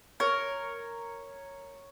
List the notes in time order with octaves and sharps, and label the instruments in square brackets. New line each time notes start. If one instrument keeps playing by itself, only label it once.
[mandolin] A#4 [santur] C#5